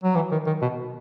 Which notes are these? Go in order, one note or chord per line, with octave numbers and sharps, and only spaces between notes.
F#3
E3
D#3
D#3
B2